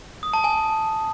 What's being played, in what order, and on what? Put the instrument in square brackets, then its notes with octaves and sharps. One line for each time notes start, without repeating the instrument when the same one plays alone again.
[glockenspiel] D#6
A5
G#5